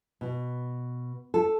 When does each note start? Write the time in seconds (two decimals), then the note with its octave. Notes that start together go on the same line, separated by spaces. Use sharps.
0.21 B2
1.34 A4